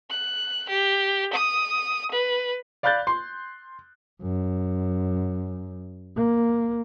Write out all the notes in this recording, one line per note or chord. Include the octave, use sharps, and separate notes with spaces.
F#6
G4
D#6
B4
D5 F5 B5 F#6 G6 A6
C6
F#2
A#3